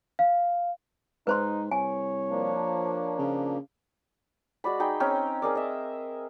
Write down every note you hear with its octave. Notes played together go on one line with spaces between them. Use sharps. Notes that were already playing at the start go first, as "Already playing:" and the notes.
F5
G#2 D#4 B4 C5 C6
C2 C#5 G#5
F3 A#3 D4
C#3
G#3 F#4 D5 B5
D#4 G#4 G5 B5
C4 C#4 D#4 G5
G#4 A#4 D5
D#5 E5